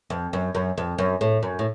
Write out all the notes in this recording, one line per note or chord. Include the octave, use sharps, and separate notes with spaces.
F2
F#2
F#2
F2
F#2
A2
F#2
A2